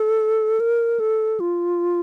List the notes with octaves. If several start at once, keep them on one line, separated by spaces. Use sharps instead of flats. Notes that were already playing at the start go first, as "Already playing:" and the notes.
Already playing: A4
A#4
A4
F4